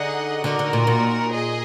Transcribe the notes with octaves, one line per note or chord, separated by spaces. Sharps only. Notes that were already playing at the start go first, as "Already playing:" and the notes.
Already playing: D3 D#4 G#4 D#5 F#5
D3 D#4 F#4 A#4
D3
A#2
A#2
G#4 D#5